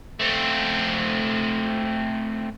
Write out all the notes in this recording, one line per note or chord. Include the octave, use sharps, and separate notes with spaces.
A3 C4